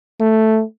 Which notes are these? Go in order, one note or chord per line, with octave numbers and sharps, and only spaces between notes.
A3